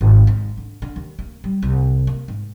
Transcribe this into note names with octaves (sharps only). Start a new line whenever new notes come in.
G#1
G#2
D3
D3
D#2
A#3
G3
C2
A#3
G#2